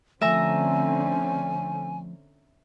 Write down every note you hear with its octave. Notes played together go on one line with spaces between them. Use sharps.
D3 F3 A3 C4 C#4 E5 G#5 A#5